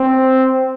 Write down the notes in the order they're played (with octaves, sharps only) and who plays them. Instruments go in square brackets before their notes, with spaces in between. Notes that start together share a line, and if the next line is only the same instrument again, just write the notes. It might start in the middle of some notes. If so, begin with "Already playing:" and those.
Already playing: [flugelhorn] C4